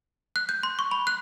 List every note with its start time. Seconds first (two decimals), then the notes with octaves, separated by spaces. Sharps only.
0.36 F#6
0.49 G6
0.63 C6
0.79 C#6
0.91 B5
1.07 F#6